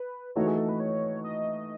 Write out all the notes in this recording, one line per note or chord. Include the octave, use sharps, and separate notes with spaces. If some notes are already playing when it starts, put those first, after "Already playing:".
Already playing: B4
E3 A3 D#4 F#4 C#5
G#4
A4
B4
C#5
D#5